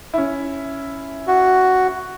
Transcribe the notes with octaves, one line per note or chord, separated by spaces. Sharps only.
C#4 E4
F#4